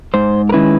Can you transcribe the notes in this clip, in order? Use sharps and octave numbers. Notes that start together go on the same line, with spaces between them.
G#2 C5
A#4
D#3 G#3 C#4 E4 B4